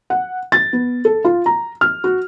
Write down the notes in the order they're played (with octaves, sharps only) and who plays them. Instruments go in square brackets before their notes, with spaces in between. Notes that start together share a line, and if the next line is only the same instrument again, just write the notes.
[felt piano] F#5
A6
B3
A4
F4
A#5
F6
F#4